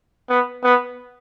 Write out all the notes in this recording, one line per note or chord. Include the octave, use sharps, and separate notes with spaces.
B3
B3